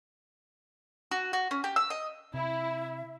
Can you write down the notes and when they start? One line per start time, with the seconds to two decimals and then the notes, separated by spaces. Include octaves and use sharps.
1.11 F#4
1.33 F#4
1.51 C#4
1.64 G4
1.76 E6
1.90 D#5
2.34 C3 E4 E5